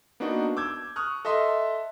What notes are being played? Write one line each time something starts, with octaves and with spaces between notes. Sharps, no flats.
A#3 B3 D4 D#4 F#4
D6 E6 G6 G#6
C#6 D#6 F6 F#6
A4 D#5 E5 C6